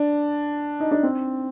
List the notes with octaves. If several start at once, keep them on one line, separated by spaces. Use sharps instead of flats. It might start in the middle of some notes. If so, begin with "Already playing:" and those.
Already playing: D4
D#4
D4
C4